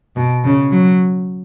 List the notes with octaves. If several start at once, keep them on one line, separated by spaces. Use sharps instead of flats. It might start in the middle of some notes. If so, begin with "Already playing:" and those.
B2
C#3
F#3